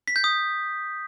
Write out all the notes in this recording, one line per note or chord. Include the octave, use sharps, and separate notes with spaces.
B6
G6
D#6